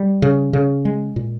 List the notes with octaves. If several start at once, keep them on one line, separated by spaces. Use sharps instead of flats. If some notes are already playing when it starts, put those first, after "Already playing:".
Already playing: G3
C#3
C#3
G#3
A#2